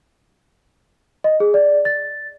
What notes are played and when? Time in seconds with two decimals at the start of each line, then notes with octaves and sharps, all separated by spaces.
1.24 D#5
1.40 G#4
1.54 D5
1.85 A6